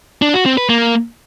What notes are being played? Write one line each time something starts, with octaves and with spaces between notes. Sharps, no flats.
D4
F#4
C4
B4
A#3